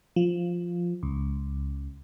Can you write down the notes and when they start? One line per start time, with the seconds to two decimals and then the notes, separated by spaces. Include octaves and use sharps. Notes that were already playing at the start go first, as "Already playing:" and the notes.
0.16 F3
1.03 C#2